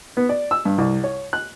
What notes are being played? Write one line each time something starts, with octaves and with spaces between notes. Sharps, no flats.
B3
D5
E6
G2
C2
C#5
F#6